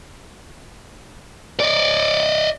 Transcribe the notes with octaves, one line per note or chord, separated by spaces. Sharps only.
D5 D#5